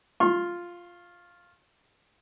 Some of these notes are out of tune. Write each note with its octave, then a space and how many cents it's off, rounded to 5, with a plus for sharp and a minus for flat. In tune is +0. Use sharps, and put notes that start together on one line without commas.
F4 +0 C#6 -45